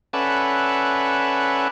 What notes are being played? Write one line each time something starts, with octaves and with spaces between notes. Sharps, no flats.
C#4 A4 B4 D5 E5 F#5